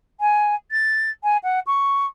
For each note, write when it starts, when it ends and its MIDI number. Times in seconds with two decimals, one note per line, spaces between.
0.21 0.55 80
0.72 1.10 93
1.24 1.37 80
1.44 1.60 78
1.67 2.06 85